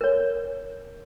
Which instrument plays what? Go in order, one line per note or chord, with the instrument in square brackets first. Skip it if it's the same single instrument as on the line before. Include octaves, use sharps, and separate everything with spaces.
[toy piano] A#4 C#5